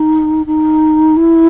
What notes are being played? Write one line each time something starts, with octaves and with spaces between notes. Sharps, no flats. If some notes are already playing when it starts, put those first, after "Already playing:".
Already playing: D#4
D#4
E4